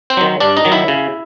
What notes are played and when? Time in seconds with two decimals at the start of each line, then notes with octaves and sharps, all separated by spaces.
0.10 C4 C5
0.17 D#3 F#3
0.40 G2 D4 D5
0.57 D#4 D#5
0.65 D#3 F#3
0.72 E4 E5
0.88 C#3